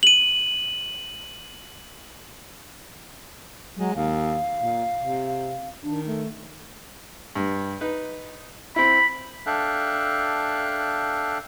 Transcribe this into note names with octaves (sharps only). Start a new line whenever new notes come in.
D#7 F#7
F#3 G#3
D#2 F5
A#2
C3
D#3 D4
A3
G2
D#4 B4
C4 E4 B5
D4 A4 E5 F5 G5 F#6